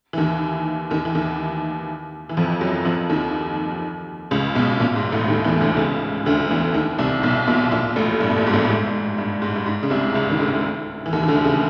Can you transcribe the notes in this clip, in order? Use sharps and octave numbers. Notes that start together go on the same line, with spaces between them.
E3
D#2 D#3
D#2 D#3
E3
D#2 D#3
E3
F2 F3
F#2 F#3
F2 F3
D#2 D#3
C#2 C#3
B1 B2
A#1 A#2
G#2
A1 A2
D#2 D#3
E2 E3
D2 D3
C#2 C#3
D2 D3
E2 E3
D#2 D#3
C2 C3
B1 B2
A#1 A#2
A#1 A#2
A1 A2
G2
B2
A#1 A#2
G#2
A1 A2
G2
G#2
G2
G#2
G2
G#2
C#3
C2 C3
C#2 C#3
D#3
D2 D3
E3
D#2 D#3
D#3
D2 D3
C#3